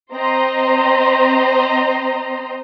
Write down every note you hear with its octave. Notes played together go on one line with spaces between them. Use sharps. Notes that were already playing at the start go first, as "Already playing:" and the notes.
C4 C5 D#5 A#5 C6